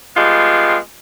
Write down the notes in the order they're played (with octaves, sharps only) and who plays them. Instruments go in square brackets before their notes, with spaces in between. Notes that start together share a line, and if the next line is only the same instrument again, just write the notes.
[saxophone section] G3 G#3 B3 F4